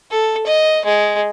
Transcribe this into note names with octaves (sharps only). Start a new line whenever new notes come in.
A4
D#5
G#3